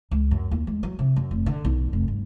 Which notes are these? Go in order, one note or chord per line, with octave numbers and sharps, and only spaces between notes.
C#2
F#2
D#2
G#3
F#3
C3
F#2
F1
D3
B1
F1
G2